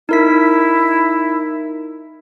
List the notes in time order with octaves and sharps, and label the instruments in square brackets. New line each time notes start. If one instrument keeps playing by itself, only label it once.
[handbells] D#4 A#4 B6 [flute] E4